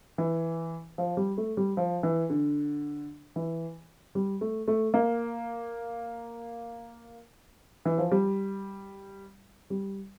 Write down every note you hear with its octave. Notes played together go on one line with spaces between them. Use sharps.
E3
F3
G3
A3
G3
F3
E3
D3
E3
G3
A3
A3
A#3
E3
F3
G3
G3